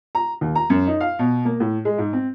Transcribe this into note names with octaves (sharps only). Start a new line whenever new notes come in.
A#5
D#2
A#5
F#2
D#4
F5
B2
A#3
A2
G#3
G#2
C4